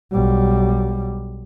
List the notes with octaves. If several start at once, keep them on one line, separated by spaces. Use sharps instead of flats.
B1 G3